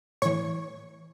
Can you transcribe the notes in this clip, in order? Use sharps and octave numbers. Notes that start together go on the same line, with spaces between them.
A2 E3 C#5 C#6